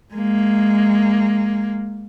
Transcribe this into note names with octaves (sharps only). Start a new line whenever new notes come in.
G#3 A#3